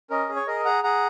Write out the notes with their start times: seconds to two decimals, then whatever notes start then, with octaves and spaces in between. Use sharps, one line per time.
0.10 C#4 A#4 D#5
0.29 G#4
0.36 C#5
0.47 G#4 A#4 D#5
0.65 G#4 F#5 A#5
0.84 G#4 F#5 A#5